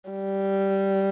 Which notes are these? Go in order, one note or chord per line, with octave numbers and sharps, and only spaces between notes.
G3